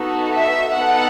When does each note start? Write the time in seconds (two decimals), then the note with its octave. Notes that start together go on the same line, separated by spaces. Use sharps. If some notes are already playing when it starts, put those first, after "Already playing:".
Already playing: B3 D#4 F#4 A4
0.33 E5
0.75 B3 D#4 A4 F#5